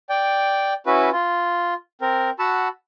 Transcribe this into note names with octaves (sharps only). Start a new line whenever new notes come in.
D5 G5
C#4 E4 F#4 B4
F4
C4 A#4
F#4 F#5 A5 B5 E6